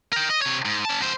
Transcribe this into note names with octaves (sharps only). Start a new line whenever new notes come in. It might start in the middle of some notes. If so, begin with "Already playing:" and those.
A#4 G5
D#5
C3 C#5
G#2
C#4 A5
F#2 C5